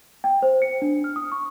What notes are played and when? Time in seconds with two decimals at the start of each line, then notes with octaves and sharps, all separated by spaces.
0.24 G5
0.42 C5
0.62 C#7
0.82 D4
1.04 F6
1.16 D#6
1.32 C#6